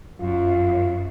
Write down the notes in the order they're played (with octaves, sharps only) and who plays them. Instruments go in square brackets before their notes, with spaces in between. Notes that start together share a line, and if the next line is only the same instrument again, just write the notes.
[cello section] F#2 [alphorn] F4